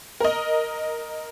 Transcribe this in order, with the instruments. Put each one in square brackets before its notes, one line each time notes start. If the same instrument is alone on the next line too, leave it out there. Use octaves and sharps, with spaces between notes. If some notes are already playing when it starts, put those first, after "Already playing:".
[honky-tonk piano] A#4 D#5